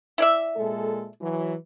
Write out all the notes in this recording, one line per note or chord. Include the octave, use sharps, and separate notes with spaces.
E4 D5 E5
A#2 G#3 A4
E3 F#3